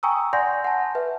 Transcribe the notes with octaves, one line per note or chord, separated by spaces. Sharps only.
G5 G#5 A#5 C#6 D#6 E6
D5 F#5 G#5 C6 G6 A#6
F#5 G#5 A5
B4 E5